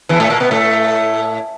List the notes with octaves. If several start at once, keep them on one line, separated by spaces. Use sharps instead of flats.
E2 E3
A2 A3
A#2 A#3
B2 B3
A2 A3